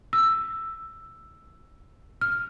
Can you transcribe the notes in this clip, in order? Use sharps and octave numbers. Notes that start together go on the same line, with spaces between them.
E6
F6